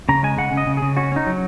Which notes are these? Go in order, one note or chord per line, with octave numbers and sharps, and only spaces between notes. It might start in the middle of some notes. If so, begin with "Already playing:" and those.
C#3 A#5
G#3 G#5
C#3 F#5
C#3 D#5
C#3
C#3 G#4
C#4 F#4
C#4 D#4
F#3